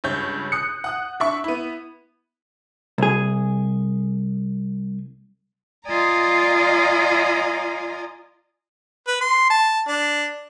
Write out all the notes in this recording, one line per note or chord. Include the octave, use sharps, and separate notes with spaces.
C#2 G2 C#5 G6
D#6 F#6 C#7
F#5 D#6 F#6
D4 E5 C#6
B3 E4
C2 G#4
F4 D5 D#5 G#5 A#5
B4
C6
A5
D4